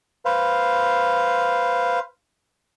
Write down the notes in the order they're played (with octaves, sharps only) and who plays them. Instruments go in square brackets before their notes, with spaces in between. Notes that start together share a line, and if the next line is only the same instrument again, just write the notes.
[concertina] B4 C5 F5